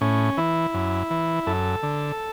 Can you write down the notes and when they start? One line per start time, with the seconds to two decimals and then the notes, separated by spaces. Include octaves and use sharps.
0.01 A2 C#4
0.37 E3 E4
0.74 F#2
1.10 E3
1.47 F#2 A4
1.83 D3